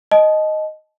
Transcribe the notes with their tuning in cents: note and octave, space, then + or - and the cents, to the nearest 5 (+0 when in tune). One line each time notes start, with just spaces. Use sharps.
D#5 +0 A5 -35